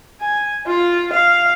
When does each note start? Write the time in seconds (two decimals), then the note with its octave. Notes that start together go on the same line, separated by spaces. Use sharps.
0.21 G#5
0.67 F4
1.13 F5